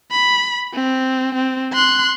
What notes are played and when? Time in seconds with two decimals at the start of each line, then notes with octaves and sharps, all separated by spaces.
0.11 B5
0.73 C4
1.35 C4
1.73 C6 F#6